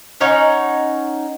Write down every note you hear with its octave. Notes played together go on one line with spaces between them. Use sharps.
C#4 D#4 C#5 F#5